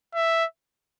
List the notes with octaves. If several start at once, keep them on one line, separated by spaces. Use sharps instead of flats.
E5